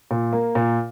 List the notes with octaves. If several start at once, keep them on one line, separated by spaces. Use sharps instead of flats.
A#2
A#3
A#2